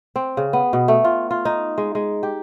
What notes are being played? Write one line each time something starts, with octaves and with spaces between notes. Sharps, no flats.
C4
C#3
B3
B2
A3
F4
F4
D#4
G#3
G#3
G4